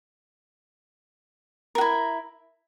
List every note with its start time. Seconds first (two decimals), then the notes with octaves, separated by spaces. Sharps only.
1.75 A#4
1.78 F#4
1.81 E4